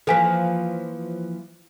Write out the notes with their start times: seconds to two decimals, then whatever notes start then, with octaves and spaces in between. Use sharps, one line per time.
0.07 E3 F3 A#3 A4 G#5 B6